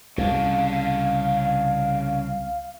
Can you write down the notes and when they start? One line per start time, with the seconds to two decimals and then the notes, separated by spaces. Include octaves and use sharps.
0.18 C2 C#3 D4 F5